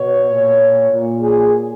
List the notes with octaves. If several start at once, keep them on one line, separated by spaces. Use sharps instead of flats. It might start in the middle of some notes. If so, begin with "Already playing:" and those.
Already playing: B2 C#5
A#2
A#2
G#4